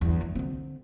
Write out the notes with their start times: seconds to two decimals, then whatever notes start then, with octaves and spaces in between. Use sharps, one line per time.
0.01 G1 E2
0.21 E3
0.35 D3 C4